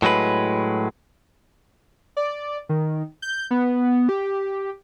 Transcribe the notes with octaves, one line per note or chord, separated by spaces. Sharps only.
A2 F#3 G#3 B4
D5
D#3
G6
B3
G4